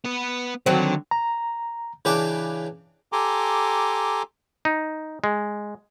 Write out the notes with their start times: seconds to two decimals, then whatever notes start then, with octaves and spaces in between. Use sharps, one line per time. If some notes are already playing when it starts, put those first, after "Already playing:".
0.05 B3 B4
0.66 D3 D#3 F#3 C4
1.11 A#5
2.05 C#3 E3 D4 B4 G5 D6
3.12 G4 A4 G#5 A#5 C6 D6
4.65 D#4
5.24 G#3